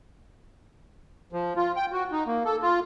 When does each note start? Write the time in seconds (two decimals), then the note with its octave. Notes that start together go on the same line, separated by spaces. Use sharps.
1.33 F3
1.56 F4
1.76 G5
1.92 F#4
2.12 D#4
2.27 A#3
2.45 A4
2.62 F4